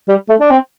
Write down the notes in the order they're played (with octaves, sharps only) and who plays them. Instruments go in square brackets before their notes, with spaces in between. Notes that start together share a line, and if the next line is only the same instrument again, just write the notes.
[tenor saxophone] G3
A3
D4
C4